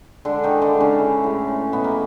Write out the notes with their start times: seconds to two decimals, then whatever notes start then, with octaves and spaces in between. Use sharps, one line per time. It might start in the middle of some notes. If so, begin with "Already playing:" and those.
0.25 D3 G#3 D4
0.43 D#3 D#4
0.49 E3
0.62 D3 D4
0.75 G#3
0.80 C#3 C#4
0.99 E3
1.24 A2
1.48 A2
1.72 B2 B3
1.84 A#3